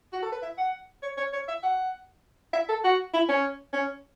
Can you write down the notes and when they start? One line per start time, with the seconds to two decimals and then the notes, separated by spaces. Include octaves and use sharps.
0.13 F#4
0.23 A4
0.32 B4
0.43 E5
0.58 F#5
1.03 C#5
1.17 C#5
1.33 C#5
1.48 E5
1.63 F#5
2.53 E5
2.69 A4
2.84 F#4
3.14 E4
3.29 C#4
3.73 C#4